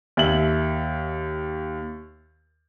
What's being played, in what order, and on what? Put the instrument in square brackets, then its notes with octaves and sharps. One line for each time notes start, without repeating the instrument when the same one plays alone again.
[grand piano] D#2 E5 F#7